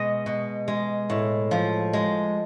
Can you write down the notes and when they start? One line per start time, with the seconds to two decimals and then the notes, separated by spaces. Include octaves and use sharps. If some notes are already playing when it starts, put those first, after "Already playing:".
Already playing: B2 G#3 D#5
0.26 B2
0.68 G#3
1.10 A2
1.51 F3
1.93 G#3